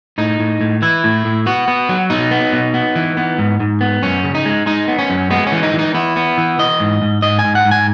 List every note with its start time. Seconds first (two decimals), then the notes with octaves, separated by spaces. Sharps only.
0.18 A2 D#4
0.40 A2
0.61 A2
0.82 E3 E4
1.04 A2
1.25 A2
1.46 B3 F#4
1.68 B3
1.89 F#3
2.10 B2 D#4
2.31 B3
2.53 B2
2.74 B3
2.96 E3
3.17 B3
3.38 G#2
3.60 G#2
3.81 B3
4.02 F#2 C#4
4.24 C#3
4.35 D#4
4.46 G#3
4.66 G#3 D#4
4.88 B3
4.99 C#4
5.10 F#2
5.30 G#3 B3
5.47 C#4
5.52 E3
5.63 D#4
5.74 E3
5.79 D#4
5.94 B3 E4
6.16 B3
6.38 E3
6.59 E3 D#5
6.80 G#2
7.02 G#2
7.22 G#2 D#5
7.39 G#5
7.44 G#2
7.55 F#5
7.65 G#2
7.71 G#5